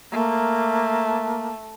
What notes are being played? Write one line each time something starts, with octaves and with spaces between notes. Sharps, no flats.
A3 A#3